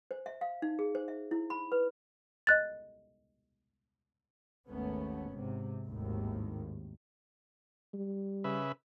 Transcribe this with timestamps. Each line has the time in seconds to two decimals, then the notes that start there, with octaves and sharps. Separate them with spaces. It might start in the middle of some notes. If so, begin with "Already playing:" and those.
0.11 C5
0.26 E5
0.41 F5
0.62 D#4
0.79 G#4
0.95 C5
1.08 E5
1.31 E4
1.50 B5
1.72 B4
2.47 D#5 F#6 A6
4.69 G#1 D#2 A3 B3 C#4
5.29 G#2 C3
5.87 G#1 D#2 A2 D#3
7.94 G3
8.44 C#3 B4 E5